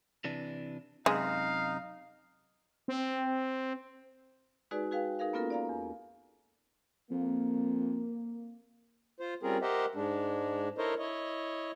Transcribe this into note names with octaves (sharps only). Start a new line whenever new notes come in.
C3 E3 D4
F#2 C3 G#3 D#4 F5
C4
G#3 D#4 F#4 G#4 B4 D5
F#4 G#4 B4 F5 G5
D#4 G#4 A#4 F5
A#3 B3 C#4 F4 A4 A#4
D5 F5 A#5
E2
F2 A#3
F4 C5
G3 C4 C#4 F4 G#4 A#4
G4 A#4 C5 D#5 E5 F#5
G#2 G#3 D4
E4 A4 A#4 C5 C#5 D#5
E4 C#5 D#5